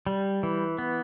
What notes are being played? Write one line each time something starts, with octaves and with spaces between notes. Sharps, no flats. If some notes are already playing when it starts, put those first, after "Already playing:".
G3
E3
B3